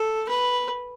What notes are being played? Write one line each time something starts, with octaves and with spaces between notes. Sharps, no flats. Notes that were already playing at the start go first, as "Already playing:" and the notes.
Already playing: A4
B4